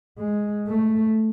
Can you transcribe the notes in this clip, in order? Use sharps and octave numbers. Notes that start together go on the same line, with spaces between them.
G#3
A3